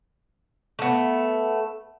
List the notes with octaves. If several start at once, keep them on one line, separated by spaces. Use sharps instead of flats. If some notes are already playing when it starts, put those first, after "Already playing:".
A3 B3